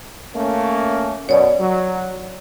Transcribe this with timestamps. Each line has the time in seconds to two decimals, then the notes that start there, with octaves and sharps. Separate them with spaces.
0.35 A3 A#3 C#4
1.29 F#2 B2 C#5 D5
1.60 F#3